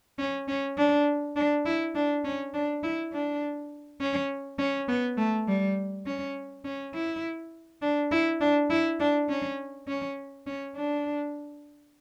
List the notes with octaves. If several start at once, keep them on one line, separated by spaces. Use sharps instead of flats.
C#4
C#4
D4
D4
E4
D4
C#4
D4
E4
D4
C#4
C#4
B3
A3
G3
C#4
C#4
E4
D4
E4
D4
E4
D4
C#4
C#4
C#4
D4